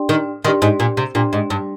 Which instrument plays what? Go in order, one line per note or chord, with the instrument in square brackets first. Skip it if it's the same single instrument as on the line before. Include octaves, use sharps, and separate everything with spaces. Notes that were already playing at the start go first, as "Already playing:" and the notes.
Already playing: [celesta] D4 G4 D5 G5 C6
[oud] D#3
[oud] D#3 [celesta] D4 G4 D5 G5 C6
[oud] G#2
A#2
C3
[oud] A#2 [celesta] D4 G4 D5 G5 C6
[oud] G#2
G2